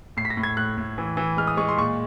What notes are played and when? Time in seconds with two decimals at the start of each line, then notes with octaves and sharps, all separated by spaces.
0.17 A2 C7
0.25 B6
0.30 A#6
0.37 A2
0.43 G#6
0.57 A2 F#6
0.77 A2
0.98 E3
1.17 E3
1.37 G#3 F6
1.47 D#6
1.57 G#3 C#6
1.68 C6
1.77 A#2 C#6